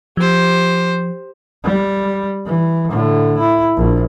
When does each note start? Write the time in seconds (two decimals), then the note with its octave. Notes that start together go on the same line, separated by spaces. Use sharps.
0.17 F3 G4 C5
1.64 G3
2.46 E3
2.90 A2 D3
3.38 E4
3.77 A#1